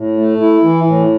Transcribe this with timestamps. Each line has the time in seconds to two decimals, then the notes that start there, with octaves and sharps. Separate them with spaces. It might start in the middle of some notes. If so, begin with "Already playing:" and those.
Already playing: A2
0.17 A3
0.40 E4
0.63 E3
0.87 A2